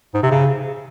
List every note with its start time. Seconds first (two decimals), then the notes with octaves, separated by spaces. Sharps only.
0.14 G#2
0.23 C3
0.31 C#3